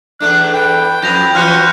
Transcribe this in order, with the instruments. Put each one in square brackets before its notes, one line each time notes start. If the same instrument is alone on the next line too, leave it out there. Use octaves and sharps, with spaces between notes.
[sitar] E2 A3 D4 [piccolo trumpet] F#6
[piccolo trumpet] B4 [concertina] G5
[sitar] F2 F3 [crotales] G6 A#6 F7
[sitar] E3 C#4 F#4 [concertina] F4 [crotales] F6 F#6 C#7